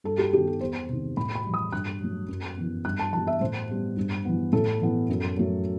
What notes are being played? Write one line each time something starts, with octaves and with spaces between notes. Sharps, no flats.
G2 A4
G4
D#3 G3 B3 G4
A4
E2 C5
C3 D#3
A2 B5
B5
E3 G3
D#6
G2 F#6
F#3 A3
F#2
E3 B3
G2 F#6
A5
E3 G3 B3 A5
E5
A2 C5
G3 B3
G2
E3 B3
A2 A4
E3 B3
F#2
F#3 A3